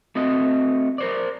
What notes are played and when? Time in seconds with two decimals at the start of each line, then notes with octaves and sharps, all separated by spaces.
0.15 A3 C4 F#4 D#5
0.98 A#4 C5 D5